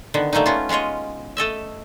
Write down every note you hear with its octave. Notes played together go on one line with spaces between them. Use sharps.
D3 D#3 B3
G3 A3 A#3 C#4 D#4
B3 C#4 F4
G#3 C#4 F4 C#5 D#5
A3 A4 D#5 E5